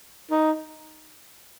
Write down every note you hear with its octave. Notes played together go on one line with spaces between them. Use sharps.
D#4